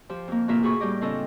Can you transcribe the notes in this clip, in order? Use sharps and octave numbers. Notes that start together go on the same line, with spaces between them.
F3 G4 C5
F2 A#3
A2 C3 E3 A#3 F4 E5
F#4 G#4 B5 C#6
A2 G3 G4 D#5 D6
C#3 C4 D4 F4 A4 D#5